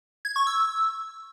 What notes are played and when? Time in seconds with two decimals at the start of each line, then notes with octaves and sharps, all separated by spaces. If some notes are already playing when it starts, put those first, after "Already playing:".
0.25 G#6
0.36 C#6
0.47 E6